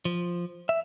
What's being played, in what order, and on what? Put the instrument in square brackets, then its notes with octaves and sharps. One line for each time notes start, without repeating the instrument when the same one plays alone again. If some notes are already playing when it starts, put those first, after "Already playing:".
[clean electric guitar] F3
E5